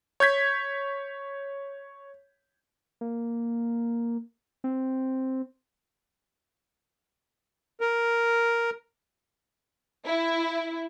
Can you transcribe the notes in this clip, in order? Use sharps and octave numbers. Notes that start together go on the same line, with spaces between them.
C#5 G6 G#6 B6
A#3
C4
A#4
E4